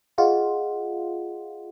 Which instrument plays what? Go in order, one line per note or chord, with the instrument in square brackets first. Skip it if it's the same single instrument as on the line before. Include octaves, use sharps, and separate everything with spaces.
[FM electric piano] F4 [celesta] G#4 D#5 F#5